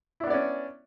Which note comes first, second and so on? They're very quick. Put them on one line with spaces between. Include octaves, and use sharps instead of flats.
E4 D4 B3 D5 C#4